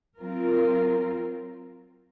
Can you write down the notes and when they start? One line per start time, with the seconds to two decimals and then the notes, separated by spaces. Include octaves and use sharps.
0.19 F#3 C4 F4 A#4